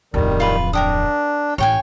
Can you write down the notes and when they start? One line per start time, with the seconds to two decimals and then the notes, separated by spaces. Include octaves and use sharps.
0.14 D1 F2 D#3 G3
0.40 F4 B4
0.73 D4 A#4 G5 D#6
1.58 A1 C#5 G5 G#5